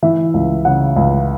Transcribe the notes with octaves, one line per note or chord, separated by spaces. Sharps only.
E3 E5
C#2
C#3 F#5
C#2